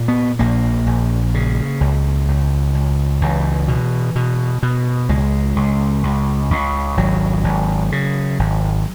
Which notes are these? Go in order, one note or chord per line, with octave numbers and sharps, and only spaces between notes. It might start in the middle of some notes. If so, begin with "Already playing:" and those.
Already playing: A#2
B3
A#1 A#3
A#1
C#3
C#2
C#2
C#2
C#2 E3
B2
B2
B2
C#2 G#3
C#2
C#2
C#2
G#1 F#3
G#1
C#3
G#1